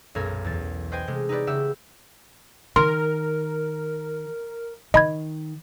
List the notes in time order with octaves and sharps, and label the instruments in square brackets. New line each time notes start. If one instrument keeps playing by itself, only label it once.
[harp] B1 F#2 A#2 A4 A#4 G#6
E2 A6
B4 C5 D#5 G5 G#5
C3 G#3 A3
D#4 E4 G4 B4 D5
C#3 F#4 G4 E5 E6
[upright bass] D#3 [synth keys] A#4 [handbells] C6
[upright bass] D#3 [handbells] D#5 B5 G#6